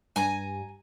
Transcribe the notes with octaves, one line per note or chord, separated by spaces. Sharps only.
G2 G#5 A#5